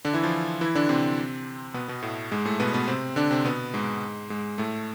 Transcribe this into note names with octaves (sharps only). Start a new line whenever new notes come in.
D3 D4
E3 E4
F3 F4
E3 E4
D3 D4
C3 C4
B2 B3
B2 B3
A2 A3
G#2 G#3
A2 A3
B2 B3
B2 B3
C3 C4
D3 D4
C3 C4
B2 B3
G#2 G#3
G#2 G#3
A2 A3